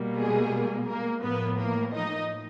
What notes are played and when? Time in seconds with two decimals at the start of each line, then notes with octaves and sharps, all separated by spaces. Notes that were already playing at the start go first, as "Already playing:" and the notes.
Already playing: B2 G3 A#3
0.16 G#3 G#4
0.87 A#3 A#4
1.22 A2 F3 A#3 B3 B4
1.58 A#3 A#4
1.94 D#4 D#5